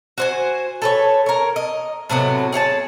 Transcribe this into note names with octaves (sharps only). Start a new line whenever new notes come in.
F#4 C5 G#5
A4 B4 C#5
A#4 C#5
D#5
A2 C3 F#3 B3
G#4 C#5 F#5 A5